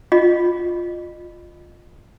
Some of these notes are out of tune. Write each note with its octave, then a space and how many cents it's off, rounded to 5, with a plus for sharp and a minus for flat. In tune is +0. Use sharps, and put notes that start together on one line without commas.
F4 +5 D#5 -30